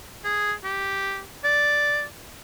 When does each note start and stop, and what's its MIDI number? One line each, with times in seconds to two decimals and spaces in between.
0.24 0.53 68
0.64 1.21 67
1.44 2.03 74